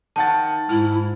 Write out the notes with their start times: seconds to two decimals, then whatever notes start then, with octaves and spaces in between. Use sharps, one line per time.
0.16 D#3 F#5 A5 A6
0.69 G#2 E4 F6